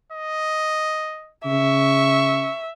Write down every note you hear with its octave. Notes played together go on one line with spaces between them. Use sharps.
D#5
C#3 E5 C#6